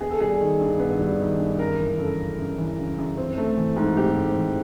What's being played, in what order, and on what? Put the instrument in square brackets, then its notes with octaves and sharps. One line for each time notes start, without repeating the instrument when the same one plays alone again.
[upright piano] B3 G#4
A4
G3 G#4
D#3
G2
B3
G3
D#3
G2
F#2 A#4
E3
C#3 A4
F#2
F#2
E3
C#3
F#2
C4
A3
E3
G#2
C4 G4
A3
E3